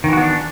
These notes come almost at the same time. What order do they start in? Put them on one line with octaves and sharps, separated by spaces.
D#3 E3 F#4 B3 D4